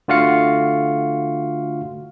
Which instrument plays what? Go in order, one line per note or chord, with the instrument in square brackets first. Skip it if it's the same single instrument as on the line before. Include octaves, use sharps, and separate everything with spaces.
[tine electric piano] D3 A3 F4 F#4 F5 C#7